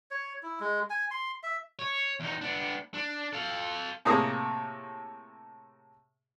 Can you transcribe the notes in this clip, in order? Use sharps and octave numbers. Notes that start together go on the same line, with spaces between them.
C#5
E4
G#3
G#5
C6
E5
C#5
E2 D#4
B3 D4
D4
A4 F5
A2 C3 A#3 G#4 D#6